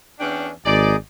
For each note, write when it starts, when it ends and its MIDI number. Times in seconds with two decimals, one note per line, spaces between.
0.20 0.50 40
0.20 0.50 61
0.20 0.50 62
0.20 0.47 79
0.66 0.95 32
0.66 0.96 63
0.66 0.96 68
0.66 0.93 74
0.66 0.96 75